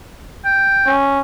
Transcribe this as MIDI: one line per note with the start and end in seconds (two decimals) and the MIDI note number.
0.45 0.92 79
0.86 1.21 61